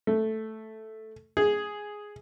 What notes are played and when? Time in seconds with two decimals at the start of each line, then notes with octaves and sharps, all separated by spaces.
0.07 A3
1.37 G#4